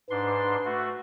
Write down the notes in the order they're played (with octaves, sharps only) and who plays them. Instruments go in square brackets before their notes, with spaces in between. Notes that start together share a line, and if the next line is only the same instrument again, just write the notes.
[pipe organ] G#2 D4 C6 [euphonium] B4
[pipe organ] A3 F#4